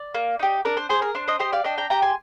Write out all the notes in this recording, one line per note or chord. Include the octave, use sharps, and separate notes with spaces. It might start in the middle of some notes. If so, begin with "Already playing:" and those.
Already playing: D5
A#3
D#4 G4
D4 A#4 D5
C5
G#4 C5
A#4
D4 C5
C5 D#5
G4 C5 D#5
D5 F5
D4 D#5 G5
G5 A#5
G4 G5 A#5
G#5 C6